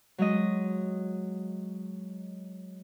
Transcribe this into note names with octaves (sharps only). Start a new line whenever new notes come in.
F#3 G#3 D#5